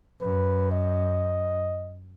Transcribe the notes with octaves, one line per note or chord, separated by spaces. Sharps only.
F#2 B4
D#5